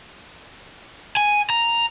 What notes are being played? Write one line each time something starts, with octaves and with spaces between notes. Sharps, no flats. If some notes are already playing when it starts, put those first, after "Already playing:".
G#5
A#5